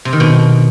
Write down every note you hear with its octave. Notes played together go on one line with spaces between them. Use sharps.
C3
D#3
B2